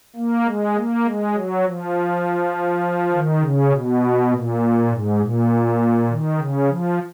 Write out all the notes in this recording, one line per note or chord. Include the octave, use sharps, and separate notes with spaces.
A#3
G#3
A#3
G#3
F#3
F3
D#3
C#3
B2
A#2
G#2
A#2
D#3
C#3
F3